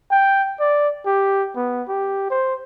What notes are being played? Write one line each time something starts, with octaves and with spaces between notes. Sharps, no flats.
G5
D5
G4
B3
G4
C5